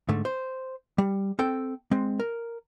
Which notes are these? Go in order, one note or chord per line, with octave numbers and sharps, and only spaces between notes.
G#2 D3 A3
C5
G3
C4 A4 G5
G#3 C4
A#4